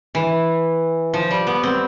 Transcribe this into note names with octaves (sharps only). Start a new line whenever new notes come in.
E3
F3
G3
B3
C4